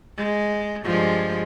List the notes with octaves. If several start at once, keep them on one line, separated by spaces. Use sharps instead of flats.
G#3
G2 F3 G#3